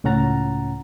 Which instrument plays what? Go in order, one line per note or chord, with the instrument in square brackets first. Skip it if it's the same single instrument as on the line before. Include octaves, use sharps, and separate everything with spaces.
[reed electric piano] C#2 A2 C#4 F#5 A#5 A6